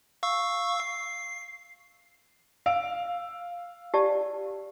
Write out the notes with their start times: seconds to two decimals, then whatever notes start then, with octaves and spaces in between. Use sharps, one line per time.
0.23 F5 C#6 E6
0.80 C7
2.66 F5 E6 D7
3.94 G4 D5 A5